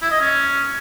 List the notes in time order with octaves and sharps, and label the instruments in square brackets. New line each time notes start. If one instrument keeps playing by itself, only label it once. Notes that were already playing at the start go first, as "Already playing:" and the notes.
[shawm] E4
D#5
C#4